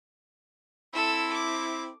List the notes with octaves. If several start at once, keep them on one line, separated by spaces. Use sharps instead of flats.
C4 E4 A4 E6
D6